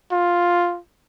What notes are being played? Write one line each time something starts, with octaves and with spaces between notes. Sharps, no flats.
F4